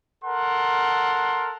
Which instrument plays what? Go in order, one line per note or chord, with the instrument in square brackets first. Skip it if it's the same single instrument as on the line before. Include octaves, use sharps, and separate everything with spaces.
[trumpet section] A4 A#4 F#5 C6